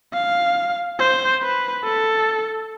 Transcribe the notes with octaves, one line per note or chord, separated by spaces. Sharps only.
F5
C5
B4
A4